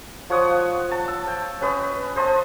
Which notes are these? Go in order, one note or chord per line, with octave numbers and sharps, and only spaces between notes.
F3 C#5 F#5 D#6
A5
E6
G5
C#4 B4 D#5
C5 D#5 A5